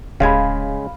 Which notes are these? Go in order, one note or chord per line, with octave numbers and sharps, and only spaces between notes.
D1 C#3 G#3 F5 G#5 B5